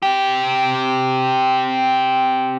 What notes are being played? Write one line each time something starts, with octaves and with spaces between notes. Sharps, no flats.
C4 G4